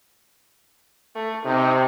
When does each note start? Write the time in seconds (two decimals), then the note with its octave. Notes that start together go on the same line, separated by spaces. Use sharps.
1.15 A3
1.45 C3 C4 D#4